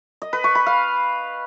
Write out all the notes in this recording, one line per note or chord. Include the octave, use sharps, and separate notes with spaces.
D#5
B4
C#6
B5
F5